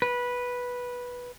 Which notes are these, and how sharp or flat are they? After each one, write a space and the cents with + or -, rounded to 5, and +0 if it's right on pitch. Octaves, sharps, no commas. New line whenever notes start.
B4 -10